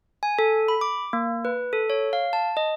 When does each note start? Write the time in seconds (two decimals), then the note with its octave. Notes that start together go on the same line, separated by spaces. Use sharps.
0.23 G#5
0.39 A4
0.68 B5
0.81 D6
1.13 A#3
1.45 B4
1.73 A4
1.90 C#5
2.13 F5
2.33 A5
2.57 D#5